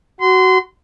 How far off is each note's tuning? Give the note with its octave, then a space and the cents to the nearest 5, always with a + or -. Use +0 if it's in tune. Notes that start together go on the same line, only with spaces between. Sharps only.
F#4 +15 C6 -25